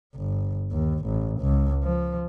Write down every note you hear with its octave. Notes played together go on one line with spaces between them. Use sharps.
G1
D#2
A1
C#2
F3